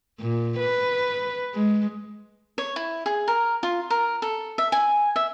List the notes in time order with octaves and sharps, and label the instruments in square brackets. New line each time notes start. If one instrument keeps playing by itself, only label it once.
[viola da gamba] A#2
B4
G#3
[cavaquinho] C#5
E4
G#4
A#4
F4
A#4
A4
E5
G#5
E5